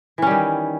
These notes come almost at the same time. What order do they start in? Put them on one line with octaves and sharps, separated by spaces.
E3 C#4 G3 D#3